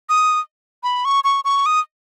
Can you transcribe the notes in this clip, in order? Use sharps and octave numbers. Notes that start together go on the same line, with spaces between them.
D#6
B5
C#6
C#6
C#6
D#6